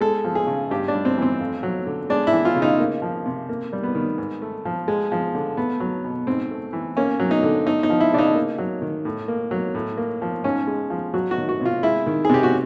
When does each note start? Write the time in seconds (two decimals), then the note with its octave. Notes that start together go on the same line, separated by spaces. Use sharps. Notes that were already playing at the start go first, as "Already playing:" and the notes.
0.01 G#3 A4
0.25 F3
0.35 G#4
0.47 C#3
0.71 G2 G4
0.88 D4
0.94 G3
1.05 C4
1.18 E3 C4
1.40 F2
1.63 F#3
1.87 D3
2.10 G#3 D4
2.27 E4
2.33 E3
2.45 F4
2.56 C#3
2.62 D#4
2.80 A#3
3.02 F3
3.26 C3
3.49 A#3
3.73 G3
3.83 B3
3.95 D#3
4.18 G#2
4.42 A3
4.65 F3
4.88 G#3
5.12 F3
5.35 D3
5.57 A3 B3
5.80 F#3
6.04 B2
6.27 G#2 C4
6.51 A3
6.73 E3
6.97 A#3 C#4
7.20 F#3
7.31 D#4
7.43 D3
7.66 A3 D#4
7.83 D#4
7.90 F3
8.00 E4
8.13 C#3 D4
8.18 D#4
8.35 A#3
8.58 F#3
8.82 D#3
9.05 A2
9.28 A#3
9.51 F#3
9.75 A2
9.97 A#3
10.22 F3
10.44 G#2 C#4
10.67 G#3
10.90 F3
11.14 F#3 F#4
11.31 F#4
11.37 D#3
11.49 F#4
11.61 C3 F4
11.83 G#3 E4
12.07 D#3
12.25 G#4
12.30 C3 G4
12.43 F#4